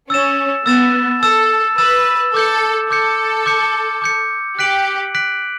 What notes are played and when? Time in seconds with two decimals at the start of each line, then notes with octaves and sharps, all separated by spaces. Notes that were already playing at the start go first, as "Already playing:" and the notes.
0.10 C#4 E6 A6 E7
0.66 B3 E6 A6 E7
1.23 A4 E6 A6 E7
1.78 B4 E6 A6 E7
2.34 A4 D6 G6 C#7
2.91 A4 D6 G6 C#7
3.46 D6 G6 C#7
4.02 D6 G6 C#7
4.58 G4 F#6 B6 D7 F#7
5.15 F#6 B6 D7 F#7